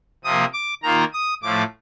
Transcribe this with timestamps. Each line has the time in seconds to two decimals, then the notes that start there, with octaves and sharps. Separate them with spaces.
0.24 C3 F3 A#3 D#6
0.53 D6
0.83 D#3 A#3 F4 A#5
1.13 D#6
1.42 A2 F3 A3 D6